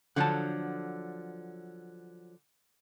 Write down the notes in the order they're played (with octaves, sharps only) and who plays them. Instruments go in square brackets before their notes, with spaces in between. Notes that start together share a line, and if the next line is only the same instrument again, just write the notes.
[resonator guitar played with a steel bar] D3 F3 F#3 [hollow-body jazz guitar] F#5 A5